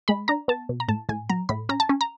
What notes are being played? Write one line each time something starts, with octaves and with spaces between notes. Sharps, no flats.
G#3 B5
D4 A#5
B3 A5
B2
A#5
A2 A5
A2 G#5
F#3 A#5
A2 B5
C#4 A#5
A5
C#4
A#5